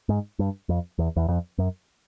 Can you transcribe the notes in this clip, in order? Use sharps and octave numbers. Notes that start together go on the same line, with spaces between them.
G#2
G2
F2
E2
E2
F2
F#2